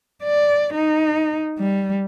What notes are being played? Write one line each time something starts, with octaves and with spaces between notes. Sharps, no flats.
D5
D#4
G3